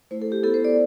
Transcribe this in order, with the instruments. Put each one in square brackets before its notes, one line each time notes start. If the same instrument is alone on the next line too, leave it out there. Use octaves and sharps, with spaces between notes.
[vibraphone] A3 E4 C5
A4
G4
B3 E4 A4
C5
D5